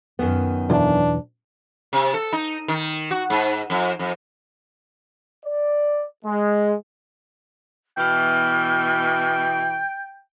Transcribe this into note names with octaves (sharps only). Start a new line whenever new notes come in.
F#2 D#3 B3
B1 E2 D4
C3
A4
D#4
D#3
F#4
G#2
F2
F2
D5
G#3
B2 E3 G5 F6